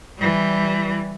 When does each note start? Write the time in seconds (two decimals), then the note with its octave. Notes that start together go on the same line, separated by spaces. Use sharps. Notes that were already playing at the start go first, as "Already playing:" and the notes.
0.18 E3 G3